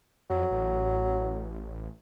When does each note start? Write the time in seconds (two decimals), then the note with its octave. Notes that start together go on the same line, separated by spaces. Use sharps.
0.30 F2 F#3
0.51 A1